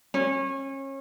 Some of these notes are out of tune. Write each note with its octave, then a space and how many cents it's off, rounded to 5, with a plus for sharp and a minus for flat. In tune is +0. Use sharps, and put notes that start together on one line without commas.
C#4 -30